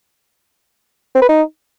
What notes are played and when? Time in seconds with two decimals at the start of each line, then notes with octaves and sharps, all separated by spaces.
1.15 C4
1.22 B4
1.29 D#4